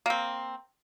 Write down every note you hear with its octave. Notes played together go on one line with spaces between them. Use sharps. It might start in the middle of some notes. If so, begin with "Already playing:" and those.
A#3 C4